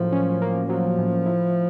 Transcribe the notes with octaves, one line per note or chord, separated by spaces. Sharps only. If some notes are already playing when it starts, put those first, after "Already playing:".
Already playing: A2 F3 F#3 A#3 C#4
C#4
A#3
F3 F#3
A2
E4